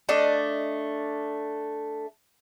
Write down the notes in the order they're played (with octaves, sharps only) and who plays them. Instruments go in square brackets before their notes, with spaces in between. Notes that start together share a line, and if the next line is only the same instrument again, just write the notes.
[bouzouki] A3 D4 D#5